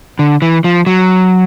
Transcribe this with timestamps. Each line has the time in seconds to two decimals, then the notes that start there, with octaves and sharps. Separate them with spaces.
0.19 D3
0.42 E3
0.64 F3
0.87 F#3